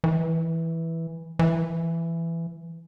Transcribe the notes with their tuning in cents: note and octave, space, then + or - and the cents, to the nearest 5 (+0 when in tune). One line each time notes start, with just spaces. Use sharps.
E3 -5
E3 +15